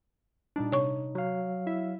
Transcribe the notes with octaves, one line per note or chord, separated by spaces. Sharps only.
A#2 G3 D4 D#4
C3 C#5 C#6
F#3 F5
E4 E5